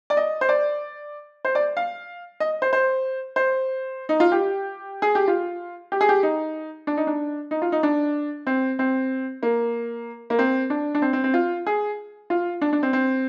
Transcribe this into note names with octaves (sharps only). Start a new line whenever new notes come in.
D5
D#5
C5
D5
C5
D5
F5
D#5
C5
C5
C5
D#4
F4
G4
G#4
G4
F4
G4
G#4
G4
D#4
D4
D#4
D4
D#4
F4
D#4
D4
C4
C4
A#3
A#3
C4
D4
D4
C4
C4
C4
F4
G#4
F4
D4
D4
C4
C4